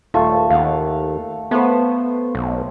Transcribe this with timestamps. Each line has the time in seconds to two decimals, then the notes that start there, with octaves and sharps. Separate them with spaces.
0.14 D#1 A3 F4
0.50 D#2 F5 F#5
1.51 A3 B3 C5
2.35 B1